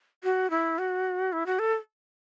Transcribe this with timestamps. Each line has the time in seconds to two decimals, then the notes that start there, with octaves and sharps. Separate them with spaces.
0.23 F#4
0.50 E4
0.78 F#4
1.32 E4
1.46 F#4
1.59 A4